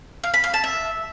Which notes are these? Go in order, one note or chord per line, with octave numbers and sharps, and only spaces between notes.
F5
B5
F5
A5
E5